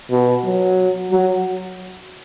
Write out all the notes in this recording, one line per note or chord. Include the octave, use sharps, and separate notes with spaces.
B2
F#3
F#3